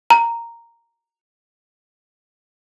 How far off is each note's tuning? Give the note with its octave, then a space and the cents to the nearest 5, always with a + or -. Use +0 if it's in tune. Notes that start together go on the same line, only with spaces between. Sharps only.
A#5 -5